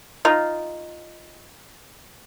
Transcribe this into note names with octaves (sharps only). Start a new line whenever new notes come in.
D#4 F4